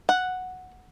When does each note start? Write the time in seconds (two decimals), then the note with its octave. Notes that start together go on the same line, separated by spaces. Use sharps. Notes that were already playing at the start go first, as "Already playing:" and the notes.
0.09 F#5